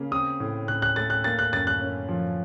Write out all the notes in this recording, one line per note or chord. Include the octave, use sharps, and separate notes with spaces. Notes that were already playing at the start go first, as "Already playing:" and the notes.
Already playing: C#3 A#3
C4 D#6
A2
A2 F#6
F#6
A3 A6
F#6
A#3 A6
F#6
F#2 A6
F#6
C#4
F3